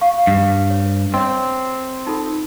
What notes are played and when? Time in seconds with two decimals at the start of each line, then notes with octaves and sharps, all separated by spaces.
0.01 F5 C#6
0.27 G2
0.70 C#5
1.14 C4 C#5 D#5
2.07 D#4 F4 A4